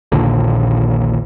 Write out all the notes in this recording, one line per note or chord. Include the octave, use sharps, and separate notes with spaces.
A#1 D#2 A#2 D3